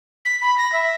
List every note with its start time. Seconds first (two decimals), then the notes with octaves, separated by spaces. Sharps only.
0.25 B6
0.41 B5
0.57 A#6
0.72 E5